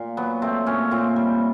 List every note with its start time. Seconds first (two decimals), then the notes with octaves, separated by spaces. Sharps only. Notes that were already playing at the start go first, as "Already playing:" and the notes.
Already playing: A#2
0.17 F#3 B3
0.42 A3 C4
0.66 A#2 C#4
0.91 A#2 C4
1.16 G3